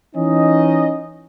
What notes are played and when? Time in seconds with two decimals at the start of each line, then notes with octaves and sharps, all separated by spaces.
0.15 E3 C#4 D#4 D#5